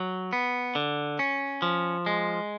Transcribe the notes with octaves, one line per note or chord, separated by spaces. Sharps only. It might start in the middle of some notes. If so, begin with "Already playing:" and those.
Already playing: F#3
B3
D3
C#4
F3
G#3